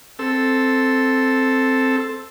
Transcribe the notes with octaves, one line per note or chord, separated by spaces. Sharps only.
C4 A4 E6